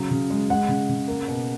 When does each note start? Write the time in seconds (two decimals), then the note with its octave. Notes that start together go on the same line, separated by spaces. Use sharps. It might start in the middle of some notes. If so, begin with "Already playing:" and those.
Already playing: C#3 F#3
0.11 C#3
0.30 G#3
0.50 G#3 F#5
0.68 C#3
0.89 C#3
1.08 A#3
1.28 B2